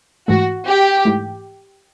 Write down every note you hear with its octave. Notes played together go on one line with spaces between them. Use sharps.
G#2 E3 A3 F#4
G4
G#2 E3 A3